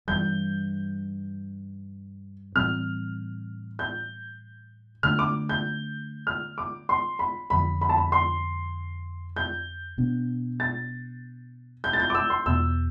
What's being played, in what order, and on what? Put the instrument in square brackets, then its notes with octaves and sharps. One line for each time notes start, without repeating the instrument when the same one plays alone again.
[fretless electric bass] G2 E3 G3 [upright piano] G6
[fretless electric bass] A2 E3 G3 C4 [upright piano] F6
[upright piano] G6
[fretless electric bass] D3 A3 D4 [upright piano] F6
[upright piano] D6
G6
F6
D6
C6
B5
[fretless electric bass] F2 D3 F3 [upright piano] B5
[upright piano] B5
A5
B5
C6
G6
[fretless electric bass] B2 B3 D4
[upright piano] A6
G6
A6
G6
D6
E6
C6
[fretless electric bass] E2 B2 B3 [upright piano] E6